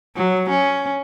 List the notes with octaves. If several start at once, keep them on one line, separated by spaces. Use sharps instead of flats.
F#3
C#4